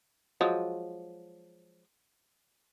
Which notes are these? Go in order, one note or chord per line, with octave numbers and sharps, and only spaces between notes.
F3 F#3 G#3